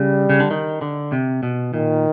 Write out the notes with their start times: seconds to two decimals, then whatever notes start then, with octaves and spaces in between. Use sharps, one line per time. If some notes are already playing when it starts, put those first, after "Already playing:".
Already playing: C#3 G3
0.29 C#3
0.40 D3
0.51 D#3
0.81 D3
1.12 C3
1.43 B2
1.73 A#2 D#3